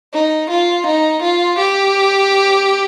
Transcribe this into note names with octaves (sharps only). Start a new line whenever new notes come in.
D#4
F4
D#4
F4
G4